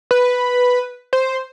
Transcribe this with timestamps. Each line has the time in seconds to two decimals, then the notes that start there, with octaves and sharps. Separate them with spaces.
0.11 B4
1.13 C5